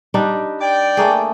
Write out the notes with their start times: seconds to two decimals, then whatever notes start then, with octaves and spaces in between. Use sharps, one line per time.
0.14 G3 D4 D#4
0.61 D5 G5
0.97 A3 A#3 G#4